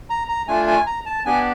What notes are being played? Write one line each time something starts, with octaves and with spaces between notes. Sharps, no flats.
A#5
A#5
A3 D4 F4 G#5
G#5
A#5
A5
B3 D4 G4 G#5